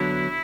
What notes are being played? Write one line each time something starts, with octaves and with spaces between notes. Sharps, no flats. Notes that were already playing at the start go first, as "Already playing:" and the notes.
Already playing: D3 F#3 B3 D4 E4